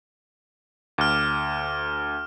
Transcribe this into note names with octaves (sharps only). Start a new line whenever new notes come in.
D2 D6 F6